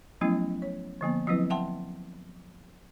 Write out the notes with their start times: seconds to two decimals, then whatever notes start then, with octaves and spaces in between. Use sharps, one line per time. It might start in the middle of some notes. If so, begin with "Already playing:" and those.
0.21 F3 F#3 A3 B3 C#4 E4
0.62 C#5
1.01 D3 F3 A#3 B3
1.27 F3 F#3 C4 E4 B4
1.50 E5 F#5 G5 A5 C6